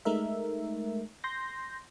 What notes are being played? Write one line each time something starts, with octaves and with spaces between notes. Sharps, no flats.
G#3 A3 D#4 A#4 E5
C6 G6 A#6